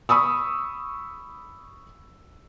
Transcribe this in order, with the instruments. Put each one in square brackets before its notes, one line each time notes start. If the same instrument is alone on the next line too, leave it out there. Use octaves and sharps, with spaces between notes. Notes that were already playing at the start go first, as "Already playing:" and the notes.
[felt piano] B5 C#6 D#6 E6